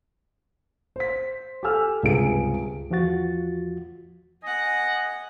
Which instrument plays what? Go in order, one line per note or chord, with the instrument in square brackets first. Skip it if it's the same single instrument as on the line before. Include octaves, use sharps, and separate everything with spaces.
[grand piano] C5 B6
G4 A4 G#5 E6 F6
C#2 G2 C3 G#4 D7
[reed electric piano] E2 F3 F4 F#4 A6
[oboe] D#5 [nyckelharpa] F#5 G#5